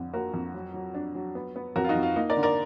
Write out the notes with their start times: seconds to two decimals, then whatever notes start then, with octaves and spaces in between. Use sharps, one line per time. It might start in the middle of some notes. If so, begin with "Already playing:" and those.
Already playing: F2 D3 F3
0.13 A#3 F#4 A#4
0.34 F2
0.54 F#3
0.74 F#3
0.94 D4
1.15 F#3
1.35 B3
1.56 B3
1.76 F2 F#4 A#4
1.84 F4
1.89 D#4 F#4
1.95 F2
2.03 F4
2.16 A#3 D#4
2.30 A#4 D5
2.37 D3
2.43 A#4 D5